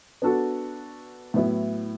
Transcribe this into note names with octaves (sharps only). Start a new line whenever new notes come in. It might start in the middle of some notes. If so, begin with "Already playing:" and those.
B3 D4 F#4 A4
A2 F#3 B3 E4